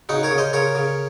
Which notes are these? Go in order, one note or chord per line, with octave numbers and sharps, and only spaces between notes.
C#3 D#4 F#4
A#4 C#5
C#3
C5 D#5
C#3 A#4 C#5
C#3